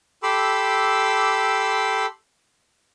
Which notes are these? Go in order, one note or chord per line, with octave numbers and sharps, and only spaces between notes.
G4 A4 B5 C6 D6 E6